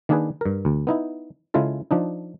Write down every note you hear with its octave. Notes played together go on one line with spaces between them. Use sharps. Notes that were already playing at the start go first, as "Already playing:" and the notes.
D#3 A#3 D4 D#4 G#4 B4
G2 A#4
D2
B3 D#4 E4
C#3 G#3 E4 F4 A4
F3 D4 D#4